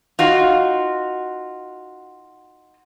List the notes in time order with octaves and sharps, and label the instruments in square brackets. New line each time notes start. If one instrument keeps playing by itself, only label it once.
[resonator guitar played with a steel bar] D#4 F4 F#4